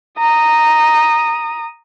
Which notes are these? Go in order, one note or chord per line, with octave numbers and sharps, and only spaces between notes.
A#5 D#6